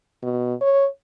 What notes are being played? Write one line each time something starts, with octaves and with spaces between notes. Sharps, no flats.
B2
C#5